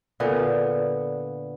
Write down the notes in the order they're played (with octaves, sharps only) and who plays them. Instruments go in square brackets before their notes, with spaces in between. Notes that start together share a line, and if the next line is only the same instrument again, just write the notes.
[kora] A#2 D3 B3